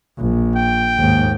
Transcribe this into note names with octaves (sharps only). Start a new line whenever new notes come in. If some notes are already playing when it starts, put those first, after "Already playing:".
A#1
G5
D#2 G#2